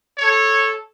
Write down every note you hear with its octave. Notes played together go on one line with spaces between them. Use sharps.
A4 C#5